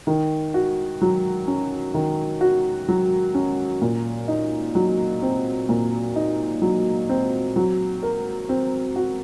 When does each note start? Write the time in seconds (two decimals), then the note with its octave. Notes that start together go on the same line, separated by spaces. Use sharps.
0.07 D#3
0.54 F#4
1.01 F#3
1.47 C#4
1.94 D#3
2.41 F#4
2.88 F#3
3.35 C#4
3.81 A#2
4.28 D#4
4.75 F#3
5.22 C4
5.69 A#2
6.16 D#4
6.62 F#3
7.09 C4
7.56 F#3
8.03 A#4
8.49 C4
8.96 F#4